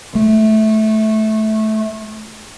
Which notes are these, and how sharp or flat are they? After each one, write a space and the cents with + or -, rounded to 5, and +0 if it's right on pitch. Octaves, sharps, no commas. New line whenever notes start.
A3 -15